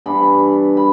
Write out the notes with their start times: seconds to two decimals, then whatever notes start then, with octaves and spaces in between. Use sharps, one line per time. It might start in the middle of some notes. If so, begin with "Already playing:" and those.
0.06 G2 E3 B3 D4 B5
0.77 B5